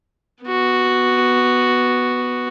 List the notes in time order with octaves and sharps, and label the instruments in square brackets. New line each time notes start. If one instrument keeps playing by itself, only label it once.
[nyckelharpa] B3 F#4